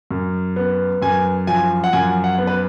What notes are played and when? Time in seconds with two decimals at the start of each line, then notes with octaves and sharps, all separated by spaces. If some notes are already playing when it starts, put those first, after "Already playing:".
0.11 F#2
0.56 B3
1.02 F#2 G#5
1.47 F3 G#5
1.84 F#5
1.93 F#2 G#5
2.24 F#5
2.38 B3
2.47 B4